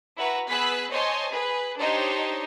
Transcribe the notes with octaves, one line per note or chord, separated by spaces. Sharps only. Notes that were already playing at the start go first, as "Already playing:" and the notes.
E4 F#4 B4 A#5
B3 G#4 B4 E6 F#6 B6
C5 C#5 D#5 G#5 A5 C6
G#4 B4
D4 D#4 G4 C5 C#5 D#5